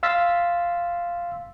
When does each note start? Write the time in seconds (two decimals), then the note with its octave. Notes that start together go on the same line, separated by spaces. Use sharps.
0.03 F5 C6 E6 A6 B6